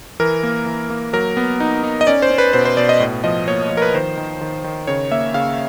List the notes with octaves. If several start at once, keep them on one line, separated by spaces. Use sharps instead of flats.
E3 A#4
A#3
E3
A#3
F#3 A#4
B3
D#4
D#4
D#5
C#4 D5
C5
C#4
B4
B2 C5
C5
B2 D5
D#5
A2
F3 D#5
A#3 C#5
F3
A#4
B4
D#3 C5
D#3
D#3
D#3
C#3 C#5
A#3 E5
C#3 F5